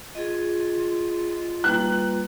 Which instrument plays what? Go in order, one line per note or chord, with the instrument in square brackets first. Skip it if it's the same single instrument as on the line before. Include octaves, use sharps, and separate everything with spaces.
[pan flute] F4 [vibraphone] G#4 D#5
[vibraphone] G3 A#3 B4 [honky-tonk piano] F#6